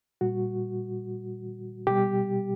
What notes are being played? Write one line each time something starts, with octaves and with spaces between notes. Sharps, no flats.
A#2 G3 F#4
B2 G3 G4